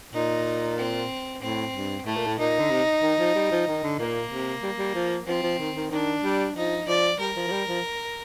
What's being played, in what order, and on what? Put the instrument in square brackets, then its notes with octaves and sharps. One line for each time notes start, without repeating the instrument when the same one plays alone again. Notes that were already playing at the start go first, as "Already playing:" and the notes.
[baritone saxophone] A#2 [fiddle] D#4
[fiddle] C4
[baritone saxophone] A2 [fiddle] C4
[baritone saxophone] G2
[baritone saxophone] A2 [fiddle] A3
[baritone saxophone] A#2
A2
[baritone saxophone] A#2 [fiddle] D#4
[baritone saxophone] D3
C3
D#3
F3
G3
F3
D#3
D3
[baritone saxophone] A#2 [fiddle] A#3
[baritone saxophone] C3
G3
G3
F3
[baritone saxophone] F3 [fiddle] C4
[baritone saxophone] F3
D#3
D#3
[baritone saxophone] D#3 [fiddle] D4
[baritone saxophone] G3
[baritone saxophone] F3 [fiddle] D#4
[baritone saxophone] F3 [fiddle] D5
[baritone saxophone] G3 [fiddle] A#4
[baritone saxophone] F3
F3
G3
F3